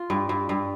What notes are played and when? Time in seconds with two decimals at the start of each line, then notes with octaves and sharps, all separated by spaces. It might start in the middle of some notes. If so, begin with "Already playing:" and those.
Already playing: F4
0.10 G2
0.29 G2
0.49 G2